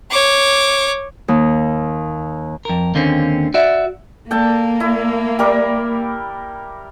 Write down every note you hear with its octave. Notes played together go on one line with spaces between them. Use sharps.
C#5 D6
D#2
F2 A#4
D#2 D3 A#3 C4 C#4
F#4 D5 E5
A#3 A4 G5 A5
E4
G3 A#4 D6